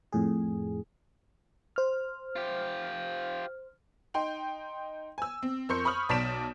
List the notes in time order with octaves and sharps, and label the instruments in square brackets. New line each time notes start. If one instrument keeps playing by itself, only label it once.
[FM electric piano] F2 A2 G#4
C5 F6
[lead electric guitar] F4 G4
[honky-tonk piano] D#4 G5 C6
G#5 E6
C4
F2 A#4 C6 C#6 G6 C#7
B5 C#6 D#6 F6 F#7
B1 D5 A5 B6 D7 E7